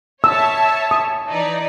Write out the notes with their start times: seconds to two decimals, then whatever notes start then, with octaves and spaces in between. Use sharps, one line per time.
0.24 C#5 E5 A5 E6
0.91 D#6
1.27 E3 D#4 D5